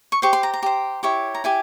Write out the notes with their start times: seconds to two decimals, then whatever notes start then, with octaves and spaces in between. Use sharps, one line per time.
0.12 C#6
0.22 G4 C5 C#6
0.33 C6
0.43 A#5
0.54 A#5
0.63 G4 C5
1.03 E4 G4 C#5
1.35 A#5
1.44 E4 G4 G#5